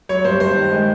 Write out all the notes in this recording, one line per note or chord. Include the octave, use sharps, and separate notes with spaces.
F#3 C#5
G2 C5
G2 C5
D#3
G#3